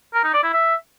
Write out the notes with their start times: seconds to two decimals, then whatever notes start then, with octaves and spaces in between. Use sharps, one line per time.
0.14 A#4
0.24 D#4
0.34 D5
0.44 E4
0.53 E5